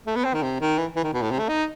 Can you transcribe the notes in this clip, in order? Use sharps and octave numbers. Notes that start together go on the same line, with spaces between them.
A3
B3
C4
D#3
C3
D#3
E3
E3
D#3
B2
A2
C3
A3
D#4